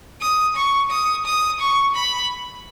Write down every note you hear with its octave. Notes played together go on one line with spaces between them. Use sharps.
D#6
C#6
D#6
D#6
C#6
B5